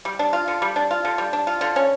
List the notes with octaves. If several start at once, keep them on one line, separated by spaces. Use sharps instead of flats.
G3
D4
F4
D3
G3
D4
F4
D3
G3
D4
F4
D3
C#4